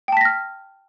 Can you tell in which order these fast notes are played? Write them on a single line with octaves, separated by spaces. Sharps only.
G5 A5 B6 A#6 F6